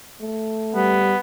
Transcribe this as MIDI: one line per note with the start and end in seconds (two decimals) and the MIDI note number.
0.21 1.06 57
0.75 1.14 55
0.75 1.20 59